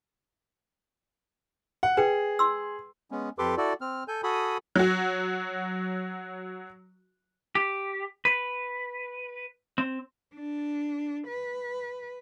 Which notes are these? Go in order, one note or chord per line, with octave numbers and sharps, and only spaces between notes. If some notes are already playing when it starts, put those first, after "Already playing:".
F#5
G#4 B4 G5
C6 E6
G#3 B3 C#4
F2 G4 A4 B4 C6 D6
E4 F#4 A4 D5
C4 F6
A4 G#5 G6
F#4 A4 G#5 B5 D#6
F#3 F#4
G4
B4
C4
D4
B4